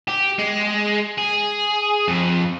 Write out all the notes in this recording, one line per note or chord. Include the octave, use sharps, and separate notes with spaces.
G4
G#3
G#4
F2